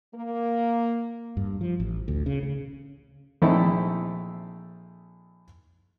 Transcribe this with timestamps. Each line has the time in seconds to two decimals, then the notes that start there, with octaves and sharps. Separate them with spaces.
0.14 A#3
1.37 G2
1.61 F3
1.80 A1
2.08 D2
2.26 C#3
2.43 C#3
3.42 A#1 A3 C4 D#4 E4 A4